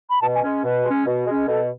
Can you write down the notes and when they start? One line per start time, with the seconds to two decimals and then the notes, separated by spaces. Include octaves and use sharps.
0.10 B5
0.22 B2 A5
0.35 G#5
0.43 G#3 C#4
0.64 B2 B4
0.85 G#3 C#4
1.06 B2
1.26 G#3 C#4
1.47 B2 A4